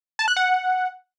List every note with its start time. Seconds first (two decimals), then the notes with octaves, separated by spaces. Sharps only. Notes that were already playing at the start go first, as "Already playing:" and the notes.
0.19 A5
0.28 F#6
0.37 F#5